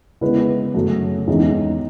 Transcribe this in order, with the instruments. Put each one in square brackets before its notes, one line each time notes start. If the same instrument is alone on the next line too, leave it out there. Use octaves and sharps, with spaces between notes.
[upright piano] C#3 G#3 B3 E4 B4
F#2 C#3 F#3 A3
E2 D#3 G#3 C#4